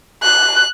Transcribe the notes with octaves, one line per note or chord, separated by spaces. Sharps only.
F#6